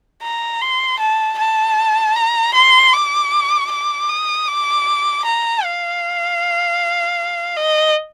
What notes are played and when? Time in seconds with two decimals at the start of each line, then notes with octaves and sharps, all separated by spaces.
0.22 A#5
0.61 C6
0.99 A5
1.38 A5
2.16 A#5
2.54 C6
2.93 D6
3.71 D6
4.09 D#6
4.47 D6
5.25 A#5
5.63 F5
7.57 D#5